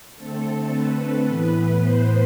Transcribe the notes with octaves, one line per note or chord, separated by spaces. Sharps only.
D3 A3 C4 A4
B4
A2 E3 B3 B4
C5